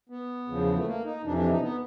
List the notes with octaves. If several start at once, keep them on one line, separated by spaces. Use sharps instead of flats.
B3
E2 C#3 F3
A3
A#3
D#4
F2 C3 E3 D4
D4
D#4
B3